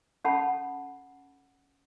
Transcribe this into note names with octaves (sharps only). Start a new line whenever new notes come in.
C#4 A4 F#5 A5 B5